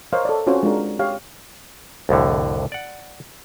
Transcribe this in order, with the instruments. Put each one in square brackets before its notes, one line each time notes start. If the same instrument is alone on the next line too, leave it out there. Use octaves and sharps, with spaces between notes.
[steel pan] A#4 C5 C#5 D#5 F5
A4 C#5 D5
C4 C#4 F4 F#4 C5
G#3 D4 F4 A#4
G4 C#5 F5
[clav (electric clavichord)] C2 F2 A2 D3
D5 F#5